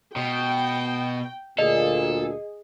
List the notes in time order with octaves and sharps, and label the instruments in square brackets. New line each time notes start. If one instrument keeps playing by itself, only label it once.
[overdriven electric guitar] B2 [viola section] G5
[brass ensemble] D2 A#2 [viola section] G#4 [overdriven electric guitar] A4 [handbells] D#5